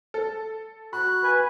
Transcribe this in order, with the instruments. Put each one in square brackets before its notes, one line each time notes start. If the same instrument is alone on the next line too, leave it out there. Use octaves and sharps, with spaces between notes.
[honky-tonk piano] A4
[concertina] F#4 F#6 [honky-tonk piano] B5
[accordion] B4 G#5